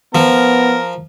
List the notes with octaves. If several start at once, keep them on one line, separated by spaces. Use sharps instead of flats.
F3 B3 A#4